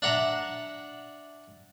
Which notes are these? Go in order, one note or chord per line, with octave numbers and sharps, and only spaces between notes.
D4 E5 F#5 A#5